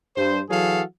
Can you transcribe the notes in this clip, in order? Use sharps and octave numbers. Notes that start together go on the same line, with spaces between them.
G2 C5
E3 F#3 F#4 G#4 A4 F5